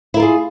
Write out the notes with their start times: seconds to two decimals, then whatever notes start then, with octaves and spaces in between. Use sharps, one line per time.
0.14 E4
0.17 A#4
0.20 F4
0.22 G#4